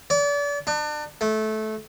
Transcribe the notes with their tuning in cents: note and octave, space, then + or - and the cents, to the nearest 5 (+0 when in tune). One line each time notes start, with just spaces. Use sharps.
D5 -35
D4 +35
A3 -20